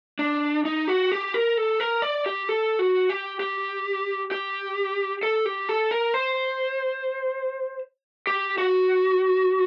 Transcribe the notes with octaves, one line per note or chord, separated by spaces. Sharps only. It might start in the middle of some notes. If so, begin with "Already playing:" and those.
D4
D#4
F#4
G4
A#4
A4
A#4
D5
G4
A4
F#4
G4
G4
G4
A4
G4
A4
A#4
C5
G4
F#4